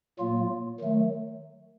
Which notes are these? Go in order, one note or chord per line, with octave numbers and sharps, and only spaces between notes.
A#2 F#3 A#3 F4
D#3 F#3 A3